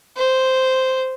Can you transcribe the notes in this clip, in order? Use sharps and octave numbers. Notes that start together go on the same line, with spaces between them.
C5